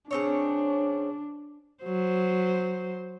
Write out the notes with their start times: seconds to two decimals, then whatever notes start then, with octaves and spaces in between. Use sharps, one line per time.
0.11 C#3 C4 D4 C#5
1.84 F#3 C5